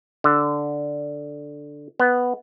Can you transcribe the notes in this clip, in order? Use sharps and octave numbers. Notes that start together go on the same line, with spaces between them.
D3
B3